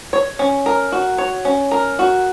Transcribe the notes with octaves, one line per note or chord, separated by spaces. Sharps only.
C#5
C#4
A#4
F#4
C#5
C#4
A#4
F#4